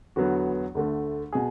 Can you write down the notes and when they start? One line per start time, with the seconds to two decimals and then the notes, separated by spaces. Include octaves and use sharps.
0.16 E2 D3 F#3 B3 F#4
0.75 D2 D3 A3
1.32 B2 G#4